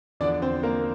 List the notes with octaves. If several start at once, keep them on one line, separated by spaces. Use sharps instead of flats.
E2 D3 F3 D4 D5
C4 C5
A#3 A#4